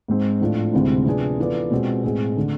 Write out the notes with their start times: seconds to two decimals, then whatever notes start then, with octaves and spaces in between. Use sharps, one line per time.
0.08 G#2 G#3 C4
0.41 A2 F3 A3 D4 F4
0.73 D2 C3 G#3 C4 E4
1.06 C3 F3 B3 D4 G#4
1.38 E3 B3 F4 A4 D5
1.71 B2 G#3 C4 F4
2.04 A2 G#3 C4 G#4
2.37 D3 A3